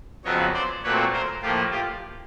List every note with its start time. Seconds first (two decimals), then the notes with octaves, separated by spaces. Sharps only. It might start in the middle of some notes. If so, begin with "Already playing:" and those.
0.24 F2 C#3 F#3 B3 C#5 D#5
0.54 C5 D5
0.84 A#2 F#3 A3 C4 B4 C#5
1.13 A#4 C5
1.42 A2 F3 A#3 F4 G4
1.71 F4 G4